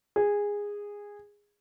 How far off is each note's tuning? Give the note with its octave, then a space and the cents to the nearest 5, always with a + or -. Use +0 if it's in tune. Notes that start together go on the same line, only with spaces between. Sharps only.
G#4 -15